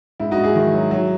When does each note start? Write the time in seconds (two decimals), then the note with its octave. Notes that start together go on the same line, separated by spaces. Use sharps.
0.20 G#2 E4
0.31 D#4 F#4
0.38 G#2
0.44 E4 G#4
0.55 D#3
0.74 F#3
0.91 F#3